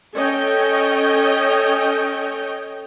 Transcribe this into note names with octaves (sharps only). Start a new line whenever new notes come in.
C#4 A4 C#5 D#5 G5